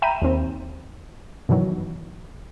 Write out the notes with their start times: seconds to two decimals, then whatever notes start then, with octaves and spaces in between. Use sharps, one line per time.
0.02 E5 G5 A#5 B5 D#7
0.22 D#2 C4
1.49 G2 B2 D#3 E3 F#3